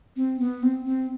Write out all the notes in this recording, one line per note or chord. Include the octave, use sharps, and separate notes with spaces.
C4
B3
C4
C4